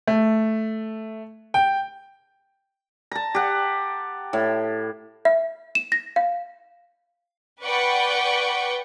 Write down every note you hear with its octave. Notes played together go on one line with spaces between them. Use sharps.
A3
G5
A5 A#5
G4 F#5
A2
E5
E7
A#6
F5
B4 D5 F#5 G5 C#6